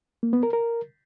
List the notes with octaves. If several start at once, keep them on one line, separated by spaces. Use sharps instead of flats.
A#3
B3
A#4
A#4